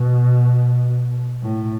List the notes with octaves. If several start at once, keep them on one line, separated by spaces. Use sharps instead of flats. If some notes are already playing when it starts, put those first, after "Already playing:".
Already playing: B2
A2